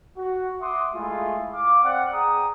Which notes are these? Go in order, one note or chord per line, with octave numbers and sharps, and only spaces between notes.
F#4
E5 F#5 C6 D6 D#6
G#3 A3 E4 F4 G#4
F5 D6
C4 D5 F#5
G#4 G5 A#5 D#6